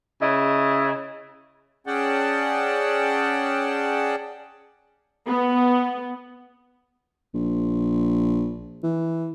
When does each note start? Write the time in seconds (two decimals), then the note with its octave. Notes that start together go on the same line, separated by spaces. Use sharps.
0.21 C#3 E4 D#5
1.87 C#4 G#4 D5 F#5 G5 A5
5.27 B3
7.34 A#1
8.84 E3